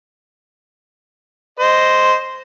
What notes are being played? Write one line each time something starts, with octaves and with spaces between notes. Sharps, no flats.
C5 D#5